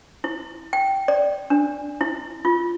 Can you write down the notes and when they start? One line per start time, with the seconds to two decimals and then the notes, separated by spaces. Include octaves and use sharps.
0.24 E4
0.73 G5
1.08 D5
1.50 D4
2.01 E4
2.45 F4